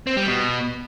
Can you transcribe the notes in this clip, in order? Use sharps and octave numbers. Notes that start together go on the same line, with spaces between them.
C4
G3
B2